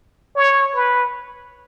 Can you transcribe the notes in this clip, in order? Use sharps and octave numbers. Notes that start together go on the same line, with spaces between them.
C#5
B4